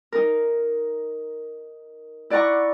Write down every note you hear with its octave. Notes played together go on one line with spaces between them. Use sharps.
D#4 A#4
E4 D5 F#5 A#5 C#6